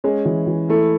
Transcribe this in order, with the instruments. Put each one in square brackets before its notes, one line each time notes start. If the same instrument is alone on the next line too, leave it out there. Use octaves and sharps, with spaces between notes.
[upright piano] G#3 [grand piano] C#4
[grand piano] E3
E3
[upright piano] A3 [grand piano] E4